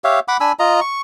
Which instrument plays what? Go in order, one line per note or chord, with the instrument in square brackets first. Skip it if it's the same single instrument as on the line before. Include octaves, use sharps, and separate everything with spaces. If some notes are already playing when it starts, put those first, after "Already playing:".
[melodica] G4 C#5 E5 F5
F#5 B5 D6
D4 G#5 B5 E6
F4 D#5 A#5
C#6